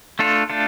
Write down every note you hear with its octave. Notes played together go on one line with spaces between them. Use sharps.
A3 D4 F4 A4
A3 D4 F4 A4